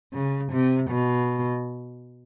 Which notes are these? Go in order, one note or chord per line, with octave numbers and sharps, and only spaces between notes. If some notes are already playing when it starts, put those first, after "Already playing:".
C#3
C3
B2